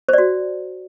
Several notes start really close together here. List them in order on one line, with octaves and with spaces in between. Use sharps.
C5 D5 F#4